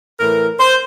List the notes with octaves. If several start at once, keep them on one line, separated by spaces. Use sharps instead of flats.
A2 E3 A#4
C5